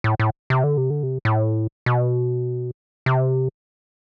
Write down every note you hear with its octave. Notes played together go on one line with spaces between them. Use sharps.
A2
A2
C3
D3
C3
D3
C3
A2
B2
C3